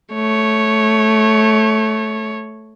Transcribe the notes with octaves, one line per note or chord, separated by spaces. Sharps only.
A3 C#5